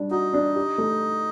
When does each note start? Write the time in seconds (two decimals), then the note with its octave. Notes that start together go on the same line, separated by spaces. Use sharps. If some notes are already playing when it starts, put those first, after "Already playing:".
Already playing: G3 D4
0.11 D#4 F#4
0.33 D4
0.56 G4
0.78 A3